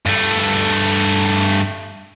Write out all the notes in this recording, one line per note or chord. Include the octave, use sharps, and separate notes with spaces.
G2 A3